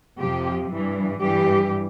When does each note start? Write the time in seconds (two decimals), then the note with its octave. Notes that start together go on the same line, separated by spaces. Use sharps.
0.18 F2 C3 F3 G4
0.70 G2 E3
1.21 G2 E3 G4